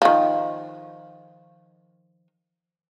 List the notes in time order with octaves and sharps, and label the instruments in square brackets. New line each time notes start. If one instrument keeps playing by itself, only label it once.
[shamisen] D#3 F3